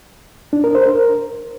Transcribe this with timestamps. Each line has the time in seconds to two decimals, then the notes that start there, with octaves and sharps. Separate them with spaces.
0.53 D4
0.64 A#4
0.75 C5
0.86 A#4